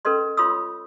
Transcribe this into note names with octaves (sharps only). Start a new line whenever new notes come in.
C#4 A4 B4 D#5 C6
F4 C#5 B5 C6 D#6 E6